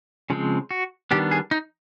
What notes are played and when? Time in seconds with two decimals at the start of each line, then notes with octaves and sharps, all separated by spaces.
0.30 C#3 F3 G#3 C4
0.71 F#4
1.11 D#3 G3 B3 D4 G4
1.31 G#4
1.51 D#4